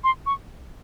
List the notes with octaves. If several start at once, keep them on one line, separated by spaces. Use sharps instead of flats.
C6
C#6